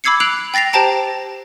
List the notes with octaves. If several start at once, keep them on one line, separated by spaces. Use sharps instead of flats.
B5 D6 E6 G#6 C7 C#7
E6 F#6 C7 D7 F7 F#7
G5 A6 A#6 C7 F7
G4 C5 G5 A5 A#5 D7